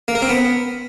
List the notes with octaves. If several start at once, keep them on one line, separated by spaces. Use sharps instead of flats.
A#3
A#4
C4
B3